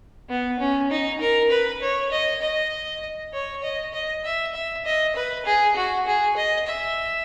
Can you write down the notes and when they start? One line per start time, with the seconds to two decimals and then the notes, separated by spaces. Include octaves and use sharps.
0.29 B3
0.60 C#4
0.91 D#4
1.21 A#4
1.51 B4
1.82 C#5
2.12 D#5
2.42 D#5
3.34 C#5
3.63 D#5
3.94 D#5
4.24 E5
4.55 E5
4.85 D#5
5.16 B4
5.46 G#4
5.76 F#4
6.07 G#4
6.37 D#5
6.68 E5